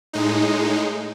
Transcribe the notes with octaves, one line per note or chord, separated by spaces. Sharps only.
A2 G#3 D#4